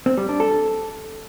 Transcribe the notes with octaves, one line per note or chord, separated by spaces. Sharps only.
C4
G3
D4
A4